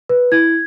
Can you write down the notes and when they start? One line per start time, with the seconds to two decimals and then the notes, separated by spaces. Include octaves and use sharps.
0.09 B4
0.32 E4 G#6